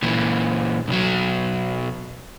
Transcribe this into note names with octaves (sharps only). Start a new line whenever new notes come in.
A#2 E3
B1 F#3